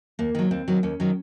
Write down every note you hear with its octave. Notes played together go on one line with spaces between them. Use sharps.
D#2 A#3
D#3 F#3
D#2 C4
D#3 F#3
D#2 C#4
D#3 F#3